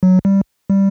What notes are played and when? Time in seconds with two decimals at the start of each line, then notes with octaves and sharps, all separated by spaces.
0.03 F#3
0.25 G3
0.70 G3